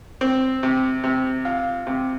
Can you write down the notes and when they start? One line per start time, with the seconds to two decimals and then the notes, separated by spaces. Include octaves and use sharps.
0.21 C4
0.63 C3
1.04 C3
1.45 F4
1.87 C3